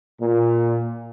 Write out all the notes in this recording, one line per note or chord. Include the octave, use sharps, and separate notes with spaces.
A#2